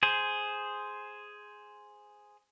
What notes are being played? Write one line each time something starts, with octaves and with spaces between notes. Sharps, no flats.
G#4 C5